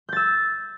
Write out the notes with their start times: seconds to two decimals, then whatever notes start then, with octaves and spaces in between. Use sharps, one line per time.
0.09 G6
0.13 A6
0.16 E6